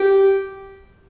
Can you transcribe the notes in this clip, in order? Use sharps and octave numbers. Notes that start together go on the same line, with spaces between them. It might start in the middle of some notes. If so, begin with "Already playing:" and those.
Already playing: G4